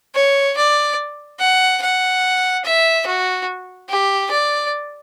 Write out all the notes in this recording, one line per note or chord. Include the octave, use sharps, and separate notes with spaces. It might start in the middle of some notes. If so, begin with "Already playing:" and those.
C#5
D5
F#5
F#5
E5
F#4
G4
D5